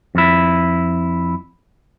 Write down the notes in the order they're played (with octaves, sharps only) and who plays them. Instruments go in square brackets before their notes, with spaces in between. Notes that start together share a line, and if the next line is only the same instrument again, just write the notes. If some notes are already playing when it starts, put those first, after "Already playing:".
[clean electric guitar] F2 E4